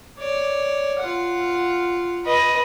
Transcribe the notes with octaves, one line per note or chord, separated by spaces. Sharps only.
C#5 D5
F4 F#5
B4 D#5